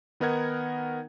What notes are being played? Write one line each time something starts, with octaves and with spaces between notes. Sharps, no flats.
D#3 B3 D#4 A#4 F#5 G#6